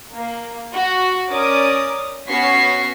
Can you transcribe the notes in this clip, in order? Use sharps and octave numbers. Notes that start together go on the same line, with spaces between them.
A#3
F#4
C#4 A#4 D5 D6 D#6
B3 C#4 F#4 C#6 B6 C7